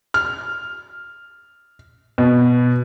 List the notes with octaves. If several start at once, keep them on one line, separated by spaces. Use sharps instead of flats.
F6
B2